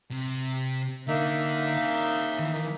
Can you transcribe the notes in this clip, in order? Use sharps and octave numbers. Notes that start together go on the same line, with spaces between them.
C3
D3 A#3 D#4 E5
C#5 F5
D#3 E3